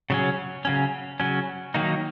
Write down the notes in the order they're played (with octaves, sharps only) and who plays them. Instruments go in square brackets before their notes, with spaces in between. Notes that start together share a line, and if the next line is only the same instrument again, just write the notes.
[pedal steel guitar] C#3 F#3 C#4
C#3 F#3 C#4
C#3 F#3 C#4
D#3 F#3 A#3 D#4